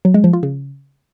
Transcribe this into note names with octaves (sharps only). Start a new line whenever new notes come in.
F#3
G#3
F3
F4
C#3